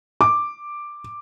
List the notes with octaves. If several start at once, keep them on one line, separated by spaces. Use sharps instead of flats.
D6